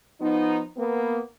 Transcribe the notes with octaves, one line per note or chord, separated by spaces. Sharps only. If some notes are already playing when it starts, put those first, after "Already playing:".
F3 B3 D#4
A#3 B3